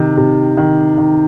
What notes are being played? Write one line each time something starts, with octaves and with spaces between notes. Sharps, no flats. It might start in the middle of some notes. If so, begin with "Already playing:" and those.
Already playing: C3 D#3
C3
D#3
D#3